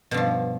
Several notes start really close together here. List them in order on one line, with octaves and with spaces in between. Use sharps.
B2 G2 F3